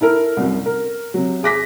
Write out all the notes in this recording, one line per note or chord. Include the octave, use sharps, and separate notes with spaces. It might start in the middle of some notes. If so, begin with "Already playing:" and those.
E4 A4 A#4
C2 F#2
A#4
C3 F#3
G#4 D6 A#6 B6